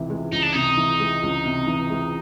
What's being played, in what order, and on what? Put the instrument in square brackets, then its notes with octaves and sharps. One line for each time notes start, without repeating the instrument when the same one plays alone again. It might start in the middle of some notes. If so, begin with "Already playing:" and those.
Already playing: [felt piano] C#2 C3 E3
G#3
[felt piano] C#2 [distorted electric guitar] D#4
[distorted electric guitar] D4
[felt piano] C3 [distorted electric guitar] D#4
[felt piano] E3
G#3
C#2
C3
E3
G#3